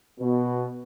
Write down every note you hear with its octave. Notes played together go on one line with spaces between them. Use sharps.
B2